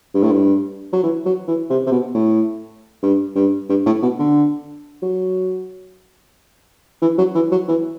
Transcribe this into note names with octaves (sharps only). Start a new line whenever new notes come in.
G2
A2
G2
F#3
E3
F#3
E3
C3
C3
B2
A2
G2
G2
G2
A2
B2
D3
F#3
E3
F#3
E3
F#3
E3